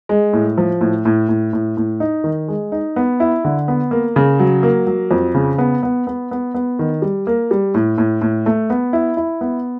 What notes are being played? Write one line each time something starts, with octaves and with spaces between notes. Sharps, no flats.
G#3
A2
F3
A2
A2
A2
A2
A2
D#4
D#3
G#3
D#4
B3
E4
D3
B3
A#3
C#3
F#3
A#3
F#3
F2
C#3
B3
B3
B3
B3
B3
D#3
G3
A#3
G3
A2
A2
A2
A3
B3
E4
E4
B3